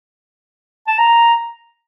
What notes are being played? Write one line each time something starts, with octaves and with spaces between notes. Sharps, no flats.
A5
A#5